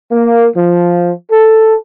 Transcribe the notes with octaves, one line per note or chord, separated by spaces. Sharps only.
A#3
F3
A4